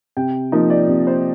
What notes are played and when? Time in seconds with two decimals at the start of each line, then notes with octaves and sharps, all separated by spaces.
0.17 C3 G5
0.52 F3 A#3 D#4 D#5
0.70 D5
0.88 C3
1.07 C5